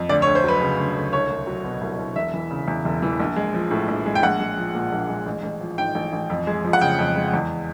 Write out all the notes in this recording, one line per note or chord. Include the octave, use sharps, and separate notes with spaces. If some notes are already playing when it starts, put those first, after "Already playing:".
Already playing: F2
D2 D5
C#5
D2
C5
F#3 B4
C#3
D2
D2
C2 C#5
C2
F#3
B2
C2
C2
E1 E5
E3
C#3
E2
E1
E3
A#1
G#3
F3
A2
A#1
G#3
G5
A#1 F#5
G#3
F3
A#2
A#1
G#3
A1
A1
F3
G#2 G5
A1
A1
F2
G#3
F3
F#5
C#3 G5
F2
G#3
E2